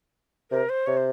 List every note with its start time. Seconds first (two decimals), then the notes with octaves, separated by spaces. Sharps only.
0.51 C3 A#4
0.69 C5
0.87 C3 C#5
0.97 C5